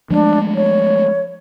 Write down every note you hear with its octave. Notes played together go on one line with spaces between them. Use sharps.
F3 G#3 A3 D4
C#5